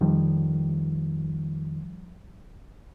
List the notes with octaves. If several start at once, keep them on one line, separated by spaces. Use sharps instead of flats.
F2 D#3 F3 G3